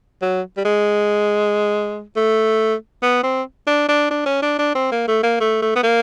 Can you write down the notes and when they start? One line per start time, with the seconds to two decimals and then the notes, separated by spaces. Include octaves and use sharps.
0.22 F#3
0.57 G3
0.65 G#3
2.16 A3
3.02 B3
3.23 C4
3.67 D4
3.89 D4
4.11 D4
4.26 C#4
4.42 D4
4.58 D4
4.75 C4
4.92 A#3
5.08 A3
5.23 A#3
5.40 A3
5.62 A3
5.76 B3
5.83 A#3